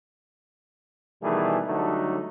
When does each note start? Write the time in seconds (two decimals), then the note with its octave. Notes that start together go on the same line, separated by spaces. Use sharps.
1.22 B2 D#3 E3 G3 A3 G#4
1.67 D3 F#3 G3 A3 D4 D#4